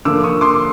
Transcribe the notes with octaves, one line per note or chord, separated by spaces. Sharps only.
D3 F3 A#3 D6 E6
C#6 D#6
C6 D6